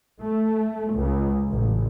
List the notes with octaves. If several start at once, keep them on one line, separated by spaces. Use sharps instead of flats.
A3
C#2
A1